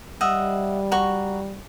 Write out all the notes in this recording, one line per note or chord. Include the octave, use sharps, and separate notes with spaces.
G3 D#5 E5 F#5
F#4 A#5 C#6